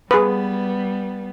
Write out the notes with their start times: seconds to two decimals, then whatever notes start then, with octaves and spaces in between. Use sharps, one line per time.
0.11 G3 B3 G#4 B4